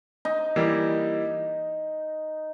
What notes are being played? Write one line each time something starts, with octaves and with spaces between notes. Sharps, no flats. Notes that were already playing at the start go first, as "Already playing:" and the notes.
D#4
E3 G3 A#3